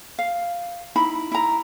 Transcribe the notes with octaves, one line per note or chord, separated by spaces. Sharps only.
F5
D#4 E4 B5
E4 A#5